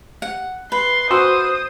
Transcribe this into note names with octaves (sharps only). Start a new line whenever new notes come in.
F#5
B4 C6
F#4 C5 C6 D#6 E6